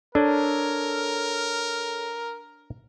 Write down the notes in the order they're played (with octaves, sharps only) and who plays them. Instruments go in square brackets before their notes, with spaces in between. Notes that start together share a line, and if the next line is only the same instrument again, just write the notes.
[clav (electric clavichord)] D4 [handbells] A4 C#5 [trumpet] A#4